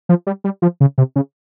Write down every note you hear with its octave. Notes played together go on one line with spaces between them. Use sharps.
F3
G3
G3
F3
C#3
C3
C#3